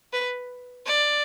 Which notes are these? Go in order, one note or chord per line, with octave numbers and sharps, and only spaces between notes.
B4
D5